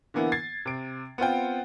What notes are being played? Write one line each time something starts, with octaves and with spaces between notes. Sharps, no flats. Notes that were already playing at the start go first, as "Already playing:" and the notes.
D3 E3 A#3 B3 E4
G#6 A6 C7
C3 D7
B3 C4 F4 G5